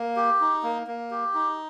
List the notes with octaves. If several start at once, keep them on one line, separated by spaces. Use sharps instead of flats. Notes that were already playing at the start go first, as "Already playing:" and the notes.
Already playing: A#3
G4
D#4
A#3
A#3
G4
D#4